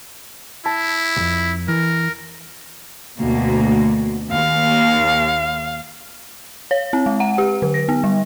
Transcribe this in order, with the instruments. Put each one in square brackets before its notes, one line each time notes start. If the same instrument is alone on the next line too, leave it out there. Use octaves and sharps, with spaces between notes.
[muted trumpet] E4 [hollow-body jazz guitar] A5
[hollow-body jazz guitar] C2 F2
[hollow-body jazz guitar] E3 [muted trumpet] A#4
[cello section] D2 B2 A#3
[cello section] D#2 [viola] F5
[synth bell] C#5
C4
G#3
F#5
G4
D3
A#6
B3
G3